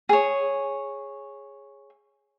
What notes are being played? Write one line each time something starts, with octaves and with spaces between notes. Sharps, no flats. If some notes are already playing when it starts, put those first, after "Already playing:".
G#4 C#5